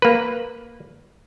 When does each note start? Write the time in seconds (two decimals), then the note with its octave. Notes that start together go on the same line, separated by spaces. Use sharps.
0.02 A#3 B4